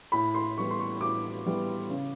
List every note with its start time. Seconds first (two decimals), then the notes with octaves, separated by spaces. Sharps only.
0.12 A2 B5
0.34 C6
0.57 E3 G3 B3 C#6
0.71 C6
0.79 C#6
1.01 A2 D6
1.46 E3 G3 B3
1.90 C#3